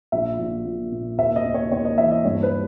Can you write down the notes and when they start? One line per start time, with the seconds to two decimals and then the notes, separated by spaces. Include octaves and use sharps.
0.12 A#1 E5
0.39 A#1
0.65 A#2
0.92 A#2
1.18 D#2 E5
1.36 D#5
1.45 D#2
1.54 C#5
1.72 D#2 C#5
1.85 D#5
1.98 E3 E5
2.11 D#5
2.25 G2 C#5
2.43 B4